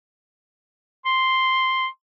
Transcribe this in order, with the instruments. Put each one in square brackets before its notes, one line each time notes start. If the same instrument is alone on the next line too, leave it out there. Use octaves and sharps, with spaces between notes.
[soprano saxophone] C6